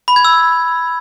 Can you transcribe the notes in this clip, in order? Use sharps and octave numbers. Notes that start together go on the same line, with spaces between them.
B5
G#6
E6